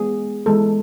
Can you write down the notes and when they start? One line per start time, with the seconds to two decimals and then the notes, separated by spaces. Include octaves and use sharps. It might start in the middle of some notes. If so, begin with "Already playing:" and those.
Already playing: E3 G#3 B3 G#4
0.46 E3 G#3 B3 A4